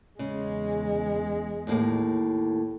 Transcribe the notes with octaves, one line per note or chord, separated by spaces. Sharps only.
E2 C#3 G#3
D#2 A2 A#3